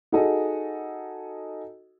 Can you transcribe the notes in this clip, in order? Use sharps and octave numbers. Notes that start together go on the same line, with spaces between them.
D#4 F#4 G#4 A4 D#5